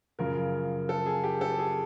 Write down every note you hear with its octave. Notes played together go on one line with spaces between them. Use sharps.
F#2 C#3 F3 A#4
A4
G#4
G4
A4
G#4